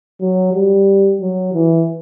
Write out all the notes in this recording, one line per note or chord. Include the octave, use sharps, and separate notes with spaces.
F#3
G3
F#3
E3